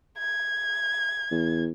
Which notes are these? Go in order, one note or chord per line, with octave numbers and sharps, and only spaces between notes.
G#6
E2